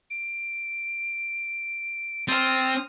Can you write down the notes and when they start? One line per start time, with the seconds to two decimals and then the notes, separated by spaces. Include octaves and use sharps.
0.10 D7
2.28 C4 D#6 F6 A6